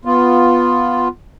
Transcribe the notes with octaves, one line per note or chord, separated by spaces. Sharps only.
B3 F4